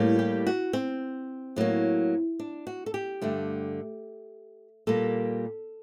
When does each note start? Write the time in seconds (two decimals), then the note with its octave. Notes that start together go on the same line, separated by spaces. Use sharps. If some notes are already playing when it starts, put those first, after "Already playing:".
Already playing: A2 G3 A#3
0.19 G4
0.47 F#4
0.73 C4
1.56 A2 F#3 A#3
2.39 D4
2.67 F#4
2.86 A4
2.94 G4
3.22 G2 D3 A3
4.87 A#2 G3 A#3 A4